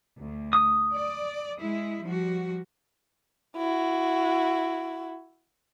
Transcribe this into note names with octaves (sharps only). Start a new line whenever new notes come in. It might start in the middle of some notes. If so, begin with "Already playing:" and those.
D2
D#6
D5
G#3 E4
F3 G3 F#4
E4 F#4